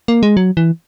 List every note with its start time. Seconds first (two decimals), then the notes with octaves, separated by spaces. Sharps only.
0.08 A#3
0.23 G#3
0.37 F#3
0.57 E3